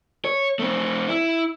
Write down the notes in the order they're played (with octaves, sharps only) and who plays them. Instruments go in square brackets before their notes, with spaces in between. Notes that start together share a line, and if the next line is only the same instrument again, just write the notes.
[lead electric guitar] C#5
A3 C4
E4